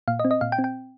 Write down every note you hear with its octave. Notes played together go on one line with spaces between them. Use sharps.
A#2 F5
D#5
C4
D#5
A#2 F5
G5
C4
G5